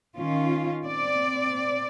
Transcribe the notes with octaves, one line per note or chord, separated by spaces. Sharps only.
D#3 C#4 F4
C4 D5